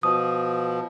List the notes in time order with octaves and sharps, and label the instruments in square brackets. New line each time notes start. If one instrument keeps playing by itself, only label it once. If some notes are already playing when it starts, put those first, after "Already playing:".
[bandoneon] B2 F3 [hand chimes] D#6